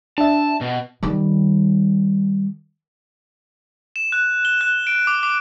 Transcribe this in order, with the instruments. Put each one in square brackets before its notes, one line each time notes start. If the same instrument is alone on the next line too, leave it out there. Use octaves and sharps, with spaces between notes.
[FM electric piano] D4 E5 [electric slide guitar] A5
[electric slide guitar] B2
[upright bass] D#3 G3
[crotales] E7
F#6
G7
F#6
D7
D6
D6